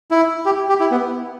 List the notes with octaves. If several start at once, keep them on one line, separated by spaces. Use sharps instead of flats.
E4
G4
G4
E4
B3